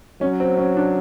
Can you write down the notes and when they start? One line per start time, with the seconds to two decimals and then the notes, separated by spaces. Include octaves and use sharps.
0.21 F#3 C#4
0.40 C4
0.58 C#4
0.77 D4